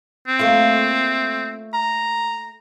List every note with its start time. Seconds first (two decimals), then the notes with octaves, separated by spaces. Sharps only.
0.28 C4
0.39 A3 A#3 F4
1.74 A#5